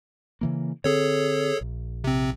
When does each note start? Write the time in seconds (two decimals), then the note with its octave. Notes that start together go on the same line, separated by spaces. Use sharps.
0.41 C#3 E3 A#3
0.84 D3 C4 G#4 A4 C#5
1.61 A#1
2.04 C3 C4